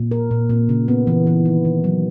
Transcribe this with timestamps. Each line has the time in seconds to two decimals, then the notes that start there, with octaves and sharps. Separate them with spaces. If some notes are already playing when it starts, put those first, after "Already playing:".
Already playing: A#2
0.11 A#4
0.31 A#2
0.50 A#2
0.69 C#3
0.88 B3
1.07 E3
1.27 E3
1.45 D#3
1.65 D#3
1.84 F#3